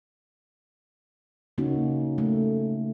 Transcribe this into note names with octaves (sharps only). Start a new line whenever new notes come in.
C#3 A#3 C#4 D#4 F#4
A3